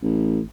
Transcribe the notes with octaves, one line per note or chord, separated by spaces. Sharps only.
A1